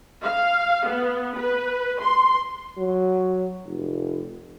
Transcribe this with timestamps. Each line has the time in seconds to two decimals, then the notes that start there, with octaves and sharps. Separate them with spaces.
0.24 F5
0.87 B3
1.37 B4
2.02 C6
2.78 F#3
3.66 F1